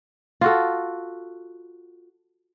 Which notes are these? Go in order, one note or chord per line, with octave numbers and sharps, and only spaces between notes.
F4 F#4 A4